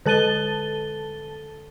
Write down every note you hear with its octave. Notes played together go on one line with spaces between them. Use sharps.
D3 A4 A5 A6 D#7 G7